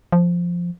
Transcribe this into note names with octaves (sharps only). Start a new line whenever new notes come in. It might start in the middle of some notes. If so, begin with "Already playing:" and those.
F3